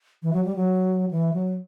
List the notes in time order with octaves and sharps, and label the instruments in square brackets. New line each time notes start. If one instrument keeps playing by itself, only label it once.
[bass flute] E3
F#3
G3
F#3
E3
F#3